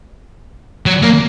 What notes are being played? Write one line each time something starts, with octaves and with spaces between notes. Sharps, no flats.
F#3
A#3